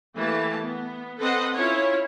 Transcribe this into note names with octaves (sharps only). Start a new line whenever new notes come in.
E3 A3 A#3 G4 A5
B3
C4 A4 B4 C5 D#5 F#5
C#4 E4 F4 C#5